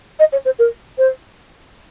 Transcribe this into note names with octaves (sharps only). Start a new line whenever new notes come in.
D#5
C#5
C5
A#4
C5